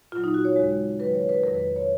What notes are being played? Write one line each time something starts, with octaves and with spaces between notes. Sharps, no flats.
A#2 F#3 F4
D#4
F#4
C#5
D#2 C#3 G#3
D#2 D#3 F#3 B4
C#5
B4
F2 D#3 F#3 A#4
B4
C#5